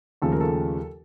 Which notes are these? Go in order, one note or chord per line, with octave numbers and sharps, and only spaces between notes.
D#2 C#3 F3 A3 A4
A#4
A4